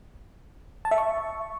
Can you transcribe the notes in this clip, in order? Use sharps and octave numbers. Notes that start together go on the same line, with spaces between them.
A5
E5
C#6